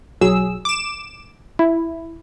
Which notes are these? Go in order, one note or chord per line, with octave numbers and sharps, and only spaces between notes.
B1 F#3 G#4 E6
D6 E7
E4